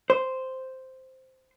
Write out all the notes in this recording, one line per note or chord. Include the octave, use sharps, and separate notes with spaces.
C5